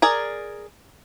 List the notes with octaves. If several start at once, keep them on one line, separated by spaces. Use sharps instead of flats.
G#4 A#4 D5